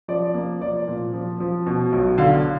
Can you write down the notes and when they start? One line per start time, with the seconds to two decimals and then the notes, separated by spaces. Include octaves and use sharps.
0.08 F3 D5
0.34 A#3
0.61 F3 D5
0.88 A#2
1.13 F3
1.40 F3
1.66 B2
1.92 B1
2.18 D3 F5